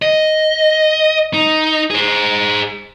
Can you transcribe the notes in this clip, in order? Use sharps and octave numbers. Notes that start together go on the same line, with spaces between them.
D#5
D#4
G#4 C5